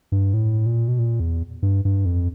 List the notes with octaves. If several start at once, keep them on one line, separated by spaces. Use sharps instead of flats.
G2
A2
A#2
B2
A#2
E2
G2
G2
F2